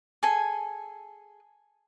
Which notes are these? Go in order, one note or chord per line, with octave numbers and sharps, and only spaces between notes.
G#4 A4 G#5